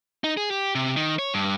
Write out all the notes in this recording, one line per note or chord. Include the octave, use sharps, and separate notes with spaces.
D#4
G#4
G4
C3
D#3
C#5
G2